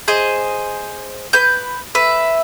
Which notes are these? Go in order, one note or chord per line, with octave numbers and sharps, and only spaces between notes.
G#4 C5 D#5
B4 G6
B4 E5